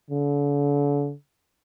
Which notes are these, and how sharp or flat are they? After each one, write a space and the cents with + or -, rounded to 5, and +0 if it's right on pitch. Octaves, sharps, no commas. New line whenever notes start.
D3 -40